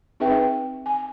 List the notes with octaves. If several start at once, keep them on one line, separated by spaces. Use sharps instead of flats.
C4 D#4 G#4 B4 E5 G5
G#5